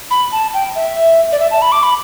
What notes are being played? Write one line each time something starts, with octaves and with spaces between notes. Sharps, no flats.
B5
A5
G5
E5
D5
E5
A5
B5
D6
B5